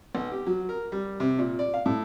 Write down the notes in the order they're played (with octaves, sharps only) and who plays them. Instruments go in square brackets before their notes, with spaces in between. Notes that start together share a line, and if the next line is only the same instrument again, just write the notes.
[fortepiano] B1
G4
F#3
A#4
G3
C3
A#2
D5
F5
A2